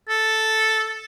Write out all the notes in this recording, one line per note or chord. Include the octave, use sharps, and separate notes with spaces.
A4